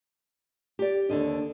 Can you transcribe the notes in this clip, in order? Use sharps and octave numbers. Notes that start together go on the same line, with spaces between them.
G4 D5
D#2 D3 D4 D#5